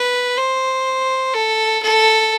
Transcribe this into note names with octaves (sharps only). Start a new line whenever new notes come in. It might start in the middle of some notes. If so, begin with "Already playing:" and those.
Already playing: B4
C5
A4
A4